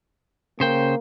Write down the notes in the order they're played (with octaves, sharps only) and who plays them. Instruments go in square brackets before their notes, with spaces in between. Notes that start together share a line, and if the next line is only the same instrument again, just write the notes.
[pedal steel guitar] C#3 C5 G5 [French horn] A#3